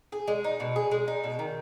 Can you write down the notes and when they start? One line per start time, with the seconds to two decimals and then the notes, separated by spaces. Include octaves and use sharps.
0.12 G#4
0.28 G#3
0.44 D#4
0.60 B2
0.76 G#4
0.91 G#3
1.08 D#4
1.24 B2
1.39 D#3